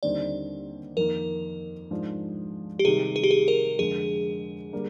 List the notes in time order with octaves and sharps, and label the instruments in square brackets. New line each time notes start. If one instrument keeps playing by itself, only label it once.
[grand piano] D#2 D3 G3 C4 D#4 [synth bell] D5
[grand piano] F2 D#3 A#3 [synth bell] A#4
[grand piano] G#2 F3 G#3 D4
[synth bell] G4
[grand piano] C3 D#3 G3 [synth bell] G#4
[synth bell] G#4
G4
G#4
A#4
[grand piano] F2 D3 G#3 [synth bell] G#4
[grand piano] D3 G3 A#3